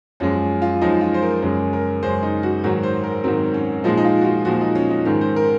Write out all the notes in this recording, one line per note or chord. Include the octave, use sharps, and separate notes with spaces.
F#2 F3 G#3 C#4
F4
F#2 F3 G#3 D#4
F4
C5
A#4
F#2 C#3 G#3 A#4
A#4
F#2 C#3 G#3 C5
D#4
F#4
G#2 D#3 F#3 F#4
C5
A#4
G#2 D#3 F#3 C4
C#4
A#2 F3 G#3 D#4
D#4
F4
F#4
F4
A#2 F3 G#3 F#4
D#4
C#4
D#4
G#2 D#3 G#3 C#4
C5
A#4